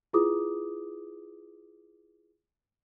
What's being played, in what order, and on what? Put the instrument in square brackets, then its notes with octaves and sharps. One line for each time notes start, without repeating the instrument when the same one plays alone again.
[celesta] E4 F4 G#4 B4 D6 D#6